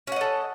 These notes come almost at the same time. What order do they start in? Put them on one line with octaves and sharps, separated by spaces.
C#4 F#5 D#5 A4